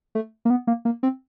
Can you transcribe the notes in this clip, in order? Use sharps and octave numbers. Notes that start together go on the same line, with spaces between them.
A3
A#3
B3
A#3
A#3
C4